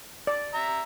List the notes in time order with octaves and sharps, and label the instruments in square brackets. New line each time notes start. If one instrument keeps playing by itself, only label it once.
[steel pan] D5
[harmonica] E5 A#5